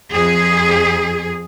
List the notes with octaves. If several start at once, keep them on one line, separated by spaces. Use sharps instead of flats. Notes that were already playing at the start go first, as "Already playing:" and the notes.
F2 G#4